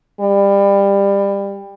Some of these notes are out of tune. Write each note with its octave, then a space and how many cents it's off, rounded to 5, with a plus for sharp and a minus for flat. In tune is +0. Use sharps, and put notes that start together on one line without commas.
G3 +25